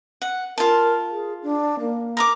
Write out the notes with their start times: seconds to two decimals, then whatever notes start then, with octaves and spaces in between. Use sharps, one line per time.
0.22 F#5
0.58 F4 A#4 A5
1.11 G#4
1.43 D4
1.80 A#3
2.17 A#4 A#5 D6